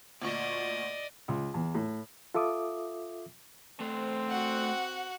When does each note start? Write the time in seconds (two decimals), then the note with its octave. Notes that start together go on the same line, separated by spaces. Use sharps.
0.22 D2 A#2 D5 D#5 C#6
1.28 C#2
1.54 E2
1.75 A2
2.34 F4 A4 E5 D6 D#6
3.80 A3 C4 C5
4.29 F#4 F#5